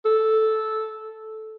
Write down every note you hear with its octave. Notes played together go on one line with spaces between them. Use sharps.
A4